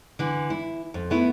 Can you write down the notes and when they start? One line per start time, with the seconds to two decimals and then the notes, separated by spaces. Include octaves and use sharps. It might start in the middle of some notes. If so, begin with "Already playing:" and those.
0.19 D3 E3
0.50 E4
0.94 F2
1.10 A3 B3 E4